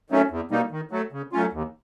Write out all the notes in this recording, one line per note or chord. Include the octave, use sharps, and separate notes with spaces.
D#3 F#3 A3 C#4
E2
B2 G3 A#3 D#4
D#3
F#3 A3
C#3
F#3 A3 C#4 F4
D#2